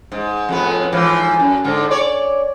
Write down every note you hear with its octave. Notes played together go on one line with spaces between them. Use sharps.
G#2
F2 A2 B3
G#2 E3 F3
F#2
G#2 D3
C#5 D5